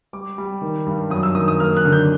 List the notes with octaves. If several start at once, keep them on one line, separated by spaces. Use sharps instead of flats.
G3 D6
G3
D#3
G2
F#2 D#6
E6
D#3 D#6
D#6
A#3 F6
F#6
D3
G6